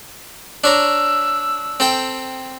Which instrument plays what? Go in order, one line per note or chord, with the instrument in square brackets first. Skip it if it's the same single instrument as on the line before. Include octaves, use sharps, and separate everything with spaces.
[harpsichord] D4 C#5 A#5 [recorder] E6
[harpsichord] C4 A4 G5